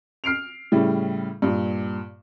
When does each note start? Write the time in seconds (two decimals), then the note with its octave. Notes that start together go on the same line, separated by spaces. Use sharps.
0.24 F6 C7 D7 F7
0.72 A2 C#3 G3 E4
1.42 G2 A#2